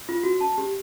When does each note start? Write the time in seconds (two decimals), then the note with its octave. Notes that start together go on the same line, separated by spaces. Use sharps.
0.09 F4
0.23 F#4
0.41 A5
0.58 G4